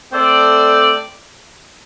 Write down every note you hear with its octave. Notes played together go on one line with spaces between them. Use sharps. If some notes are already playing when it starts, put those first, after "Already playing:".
A3 C4 A4 D5